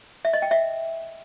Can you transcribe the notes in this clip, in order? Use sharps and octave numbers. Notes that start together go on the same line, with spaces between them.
E5
D#5
G5
E5